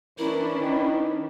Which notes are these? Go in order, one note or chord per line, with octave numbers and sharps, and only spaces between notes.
E3 C#4 D4 E4 A#4 B4
D#3